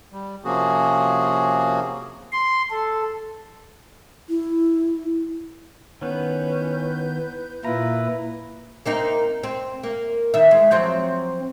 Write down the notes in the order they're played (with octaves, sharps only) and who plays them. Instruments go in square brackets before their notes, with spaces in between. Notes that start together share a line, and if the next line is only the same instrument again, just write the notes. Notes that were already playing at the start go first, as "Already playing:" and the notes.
[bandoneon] G3
C3 F3 A#3 C#4 F#4 G#4
[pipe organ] C6
A4
[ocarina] E4
[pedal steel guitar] D#3 B3 [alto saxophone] C#4 [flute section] E4 B4 G6
[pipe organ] A#2 E4 B4 [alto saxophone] F4 [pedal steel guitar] A#5
[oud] A#3 C4 D#4
C4
A#3
D#3 E5
G#3
F3 F#3 C4